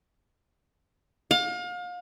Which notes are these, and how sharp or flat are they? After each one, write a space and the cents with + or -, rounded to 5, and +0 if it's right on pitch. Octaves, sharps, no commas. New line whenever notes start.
F5 +35